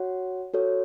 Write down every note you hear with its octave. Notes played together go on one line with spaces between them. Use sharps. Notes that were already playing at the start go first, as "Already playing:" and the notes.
Already playing: F#4 C#5 F#5
F#4 A4 C#5